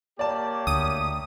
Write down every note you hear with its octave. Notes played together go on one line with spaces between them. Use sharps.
A#3 G4 C#5 D5 A5
D2 D#6